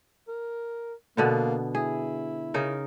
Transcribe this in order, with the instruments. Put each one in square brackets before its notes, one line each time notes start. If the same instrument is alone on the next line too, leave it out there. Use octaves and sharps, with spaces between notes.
[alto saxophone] A#4
[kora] B2 D3 B3 [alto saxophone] A#3
[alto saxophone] E4 [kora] G#4
[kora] C#3 D#4 A#4